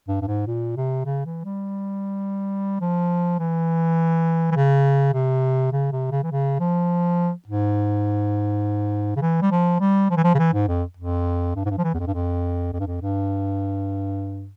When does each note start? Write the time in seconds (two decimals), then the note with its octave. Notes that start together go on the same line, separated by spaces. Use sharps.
0.08 G2
0.21 G2
0.27 G#2
0.47 A#2
0.77 C3
1.05 C#3
1.25 E3
1.45 G3
2.81 F3
3.39 E3
4.51 E3
4.56 C#3
5.14 C3
5.72 C#3
5.92 C3
6.11 C#3
6.23 E3
6.31 C#3
6.60 F3
7.47 G#2
9.16 C#3
9.22 E3
9.42 G3
9.51 F3
9.80 G3
10.10 F3
10.17 E3
10.24 F3
10.34 C#3
10.38 E3
10.53 G#2
10.68 F2
10.97 F2
11.55 G2
11.65 G#2
11.70 G2
11.78 F3
11.84 E3
11.94 E2
11.99 F2
12.07 G2
12.14 F2
12.73 F2
12.79 G2
12.87 F2
13.02 G2